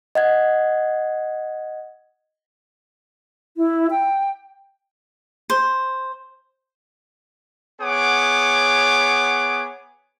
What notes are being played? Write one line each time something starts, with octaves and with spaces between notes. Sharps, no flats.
D#5 F#5 G#6
E4
G5
C5
B3 G#4 C#5 F#5 D6